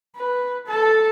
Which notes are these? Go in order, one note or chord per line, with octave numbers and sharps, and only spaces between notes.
B4
A4 A5